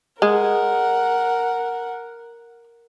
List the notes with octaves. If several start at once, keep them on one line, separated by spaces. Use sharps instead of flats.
G#3 A#4 F#5